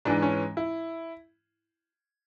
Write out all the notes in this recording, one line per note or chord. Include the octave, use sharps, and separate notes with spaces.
G#2 E3 G#3 D4
C#4
E4